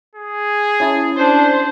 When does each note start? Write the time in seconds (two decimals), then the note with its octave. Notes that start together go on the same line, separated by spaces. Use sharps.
0.15 G#4
0.80 C#4 E4 A5
1.17 D4 C5